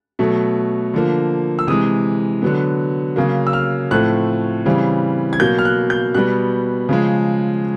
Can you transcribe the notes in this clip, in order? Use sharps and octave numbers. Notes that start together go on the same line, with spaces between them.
B2 F#3 A3
D3 F3 A#3
E6
C3 E3 G#3 D#6
D3 F#3 B3
C#3 F#3 A#3
E6
F6
A2 F3 A3 C4 F#6
C#3 E3 G3 C4
G#6
B2 F#3 A#3 G6
F6
F#6
G6
B2 G3 B3 F#6
C#3 F3 G#3